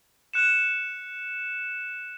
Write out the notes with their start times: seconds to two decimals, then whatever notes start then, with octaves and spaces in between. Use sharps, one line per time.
0.34 F#6 C#7 E7